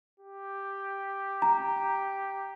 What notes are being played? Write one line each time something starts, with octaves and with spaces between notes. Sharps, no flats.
G4
A#5